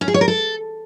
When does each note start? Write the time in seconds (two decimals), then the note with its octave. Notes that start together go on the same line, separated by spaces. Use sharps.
0.01 C#4
0.08 G#4
0.14 C#5
0.21 A#4
0.28 A4